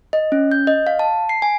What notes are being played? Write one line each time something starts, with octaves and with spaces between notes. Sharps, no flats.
D#5
C#4
G6
D#5
F5
A5
C7
G#5